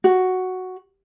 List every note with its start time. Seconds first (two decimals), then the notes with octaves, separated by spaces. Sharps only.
0.04 F#4